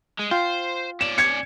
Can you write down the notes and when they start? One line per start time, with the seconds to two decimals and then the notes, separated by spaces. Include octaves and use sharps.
0.19 G#3
0.31 F4 C5 G5
1.01 C#4 D5 E7
1.18 G#6 C#7